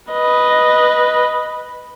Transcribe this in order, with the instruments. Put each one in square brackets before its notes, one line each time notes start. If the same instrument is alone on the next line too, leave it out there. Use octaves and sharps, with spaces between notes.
[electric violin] B4 D#5